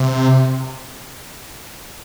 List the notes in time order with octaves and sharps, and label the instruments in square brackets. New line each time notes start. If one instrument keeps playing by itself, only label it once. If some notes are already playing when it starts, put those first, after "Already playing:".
Already playing: [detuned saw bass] C3